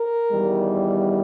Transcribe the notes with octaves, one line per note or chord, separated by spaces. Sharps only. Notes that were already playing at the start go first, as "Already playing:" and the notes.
Already playing: A#4
E2 D#3 G3